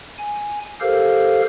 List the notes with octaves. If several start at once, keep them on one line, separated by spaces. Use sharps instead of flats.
G#5
G4 A4 A#4 C5 F5